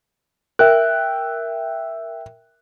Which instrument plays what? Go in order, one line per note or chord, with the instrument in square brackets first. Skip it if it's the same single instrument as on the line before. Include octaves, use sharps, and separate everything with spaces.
[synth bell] A#4 [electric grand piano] E5 G5 F#6